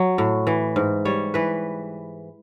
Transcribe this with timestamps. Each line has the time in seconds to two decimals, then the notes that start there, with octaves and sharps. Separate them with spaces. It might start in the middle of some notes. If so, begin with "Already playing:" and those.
Already playing: F#3
0.18 A2
0.47 E3
0.76 G#2
1.05 G3 C#5
1.34 E3 B4